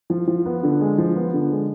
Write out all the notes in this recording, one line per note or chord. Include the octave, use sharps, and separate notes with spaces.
F3
F3
B3
D3
G#3
F3
B3
D3
G#3